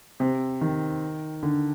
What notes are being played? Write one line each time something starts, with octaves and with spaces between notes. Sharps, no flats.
C3
D#3
D3